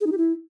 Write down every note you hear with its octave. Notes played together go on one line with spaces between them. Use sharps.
G#4
D#4
G4
E4